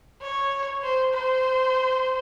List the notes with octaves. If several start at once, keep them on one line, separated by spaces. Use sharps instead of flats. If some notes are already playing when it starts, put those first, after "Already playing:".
C#5
C5
C5